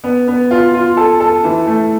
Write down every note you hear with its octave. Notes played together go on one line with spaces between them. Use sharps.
B3
B3
F4
F4
A4
A4
E3
A3